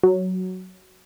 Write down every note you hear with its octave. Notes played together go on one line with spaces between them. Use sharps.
F#3